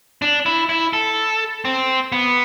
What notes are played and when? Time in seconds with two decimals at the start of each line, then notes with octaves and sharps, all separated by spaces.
0.22 D4
0.46 E4
0.69 E4
0.93 A4
1.65 C4
2.12 B3